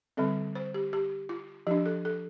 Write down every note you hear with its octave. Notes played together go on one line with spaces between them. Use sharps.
D3 G3 C4 A4
C5
G4
G4
F4
F3 D4 G4
A4
A4